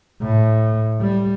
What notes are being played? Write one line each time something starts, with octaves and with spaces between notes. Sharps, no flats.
A2
G3